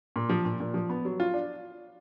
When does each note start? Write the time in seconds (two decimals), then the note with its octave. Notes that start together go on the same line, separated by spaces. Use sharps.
0.16 A#2
0.29 F3
0.45 A#2
0.60 A#2
0.74 F3
0.89 B3
1.05 F#3
1.20 F4
1.34 D4